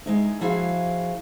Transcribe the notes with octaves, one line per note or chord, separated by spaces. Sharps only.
G#3 D#4 E4
F3 E4 F#4 G#4 F5